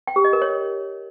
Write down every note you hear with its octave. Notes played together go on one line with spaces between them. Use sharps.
G5
G4
D#5
A#4
C#5